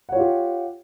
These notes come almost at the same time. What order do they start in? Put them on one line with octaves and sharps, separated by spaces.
F#5 C#5 F4 G4